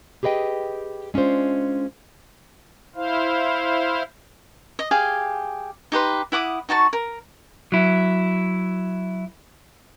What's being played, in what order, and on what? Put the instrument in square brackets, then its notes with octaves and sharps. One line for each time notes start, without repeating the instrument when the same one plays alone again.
[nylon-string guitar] G4 G#4 B4 D#5 G5
G#3 C#4 D4 F4 C5
[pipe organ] E4 C5 F5
[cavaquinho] D#5
G4 G#4 F5 G#5
D#4 G4 B4 C6
E4 F#5 D6 D#6
D#4 F#4 A5 C#6
A#4
[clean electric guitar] F#3 E4